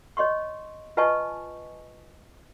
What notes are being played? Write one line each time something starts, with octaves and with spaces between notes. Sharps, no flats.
C#5 D#5 C6 C#6
F4 B4 D#5 G#5 A5 C#6